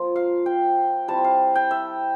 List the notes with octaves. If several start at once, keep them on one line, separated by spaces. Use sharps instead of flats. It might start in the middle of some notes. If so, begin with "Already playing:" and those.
Already playing: F3 A#3 F4
F5
G5
G3 C4 E4 A5
F5
G5
E5